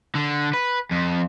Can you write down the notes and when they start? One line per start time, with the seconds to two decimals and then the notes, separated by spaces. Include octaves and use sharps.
0.15 D3
0.53 B4
0.91 F2